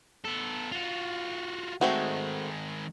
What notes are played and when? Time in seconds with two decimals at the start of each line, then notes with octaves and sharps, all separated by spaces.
0.25 B3 A4
0.72 F4 F#4
1.81 D#3 G#3 A3 C4 F#4